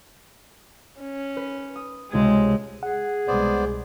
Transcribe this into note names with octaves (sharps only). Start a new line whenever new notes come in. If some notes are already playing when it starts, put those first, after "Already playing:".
C#4
B4
D#6
C#2 C3 G#3 G#6
G#4 F#5
C2 B2 G#3 B3 C5 D5